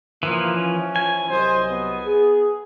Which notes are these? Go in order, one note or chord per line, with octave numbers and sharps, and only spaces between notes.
E3 F3 A#3
C#4
E3 F3 E4 G#5
C2 F#3 C5 D#5
B3
G#4